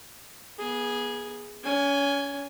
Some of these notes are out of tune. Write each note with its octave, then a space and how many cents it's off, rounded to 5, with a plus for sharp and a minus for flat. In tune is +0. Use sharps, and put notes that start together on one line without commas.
B3 -35 G#4 +0
C#4 +30 G#5 +0